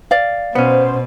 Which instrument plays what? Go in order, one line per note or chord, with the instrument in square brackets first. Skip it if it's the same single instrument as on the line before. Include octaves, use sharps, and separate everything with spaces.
[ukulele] D5 F5
[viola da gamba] B2 [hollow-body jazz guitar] B3 C#4 [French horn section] C5